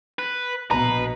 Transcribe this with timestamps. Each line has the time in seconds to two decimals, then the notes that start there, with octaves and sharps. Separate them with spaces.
0.19 B4
0.71 A#1 B2 B4 A#5